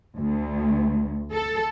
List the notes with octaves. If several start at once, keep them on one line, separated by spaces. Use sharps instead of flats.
D2
A4